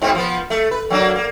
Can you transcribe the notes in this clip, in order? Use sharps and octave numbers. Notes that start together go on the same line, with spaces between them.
G#2 B2 C4
F3 B3
A3
B4
F#3 A#3 D4
A#3